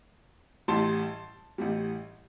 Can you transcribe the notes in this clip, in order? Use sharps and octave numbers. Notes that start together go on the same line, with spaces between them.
A1 A2 G3 A5 C6
A1 A2 G3